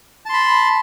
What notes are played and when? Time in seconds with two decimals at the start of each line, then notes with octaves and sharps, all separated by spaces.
0.26 A5
0.29 C6
0.33 B5